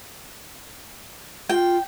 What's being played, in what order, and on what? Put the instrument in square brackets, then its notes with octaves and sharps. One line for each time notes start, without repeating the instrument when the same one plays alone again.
[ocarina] F4 [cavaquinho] G5